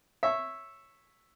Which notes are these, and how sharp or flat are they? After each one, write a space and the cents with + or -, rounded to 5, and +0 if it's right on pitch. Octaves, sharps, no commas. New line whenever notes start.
C#5 -10 E5 +0